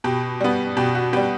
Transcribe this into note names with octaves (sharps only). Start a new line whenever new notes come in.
B2 G4
G3 B3
B2 G4
F#4
G3 B3 G4